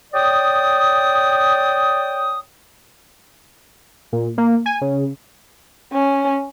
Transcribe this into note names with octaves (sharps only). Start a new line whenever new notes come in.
C#5 D5 G5 D#6
A#2
A#3
G#5
C#3
C#4